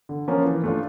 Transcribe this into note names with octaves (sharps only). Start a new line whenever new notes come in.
D3
F3 A#3 C#4 F4
E3
A3 D4 F4